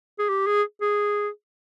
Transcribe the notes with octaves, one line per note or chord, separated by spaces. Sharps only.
G#4
G4
G#4
G#4